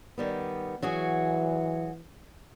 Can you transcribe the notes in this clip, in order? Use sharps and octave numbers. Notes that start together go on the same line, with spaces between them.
D#3 G3 B3
E3 F#3 F#4 G#4